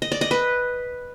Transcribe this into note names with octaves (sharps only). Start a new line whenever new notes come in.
D#5
D5
D#5
B4